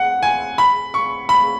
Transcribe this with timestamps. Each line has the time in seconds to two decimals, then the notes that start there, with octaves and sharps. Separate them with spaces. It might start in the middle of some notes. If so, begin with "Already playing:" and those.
Already playing: F#5
0.23 G#5
0.58 B5
0.94 C#6
1.29 B5